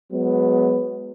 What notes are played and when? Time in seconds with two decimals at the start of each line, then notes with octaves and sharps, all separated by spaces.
0.12 F#3 G#3 B3